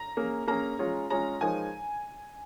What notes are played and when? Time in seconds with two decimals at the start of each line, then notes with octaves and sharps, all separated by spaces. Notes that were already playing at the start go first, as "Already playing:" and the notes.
Already playing: A#5
0.17 A#3 C#4 G#4
0.48 A#3 C#4 G#4 A#5
0.79 G#3 C#4 F4 G#4 C#5
1.10 G#3 C#4 F4 G#4 C#5 A#5
1.41 F3 G#3 D#4 A#4 C#5 G#5